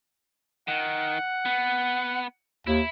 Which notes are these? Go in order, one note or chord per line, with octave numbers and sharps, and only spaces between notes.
D#3 F#5
B3
D#2 E4